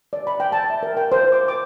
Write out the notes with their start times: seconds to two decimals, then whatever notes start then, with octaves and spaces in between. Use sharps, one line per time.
0.13 D5
0.27 B5
0.40 G5
0.52 A5
0.70 E5
0.83 A#4
0.97 G5
1.12 C5
1.32 D6
1.48 D6